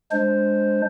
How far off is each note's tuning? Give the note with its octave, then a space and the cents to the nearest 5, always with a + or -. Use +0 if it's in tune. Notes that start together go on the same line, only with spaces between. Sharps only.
G#3 +0 D4 +0 C5 +0